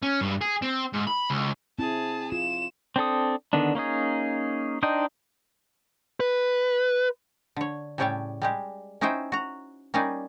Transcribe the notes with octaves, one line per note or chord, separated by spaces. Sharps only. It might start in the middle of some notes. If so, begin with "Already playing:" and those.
C#4
G2
G#4
C4
G#2
B5
C#2
C4 E4 G#4 A5
F4 E7
C4 D4 A4 D#6
D3 D#3 B3 D4
A#3 C#4 D#4 G#4
D4 D#4 C5 D#5 G5
B4
D3 C#5
A2 C#3 G3 C#5 G5 A5
G3 G#3 G4
C#4 D#4 E4 C5 E5 G5
F#4 A#5
G3 A#3 C#4 D#4 D5